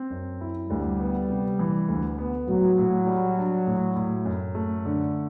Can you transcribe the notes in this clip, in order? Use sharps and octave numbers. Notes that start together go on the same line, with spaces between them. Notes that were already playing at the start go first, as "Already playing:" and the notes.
Already playing: C4
F#2
E4
D2 G3
B3
C3
E3
D2
B3
A2 F#3
A2
G3
D4
A2
A2
F#2
A3
D3